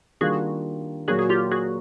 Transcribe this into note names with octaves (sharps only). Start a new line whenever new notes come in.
D#3 G3 A#3 D4 F4 F#4 G#4
A#2 F#3 A#3 F#4 G#4
G#4
F4 G4
F#4 G#4